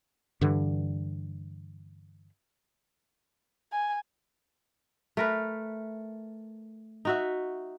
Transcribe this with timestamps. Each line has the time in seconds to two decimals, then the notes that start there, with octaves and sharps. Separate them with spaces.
0.41 G2 D3 E3
3.72 G#5
5.17 A3 A#4 B4
7.05 D#4 F#4 E5